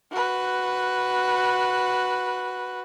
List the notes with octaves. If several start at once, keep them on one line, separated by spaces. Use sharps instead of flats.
F#4 B4